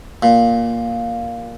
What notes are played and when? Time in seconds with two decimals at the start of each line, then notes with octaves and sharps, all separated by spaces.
0.23 A#2